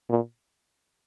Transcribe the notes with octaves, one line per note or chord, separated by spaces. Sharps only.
A#2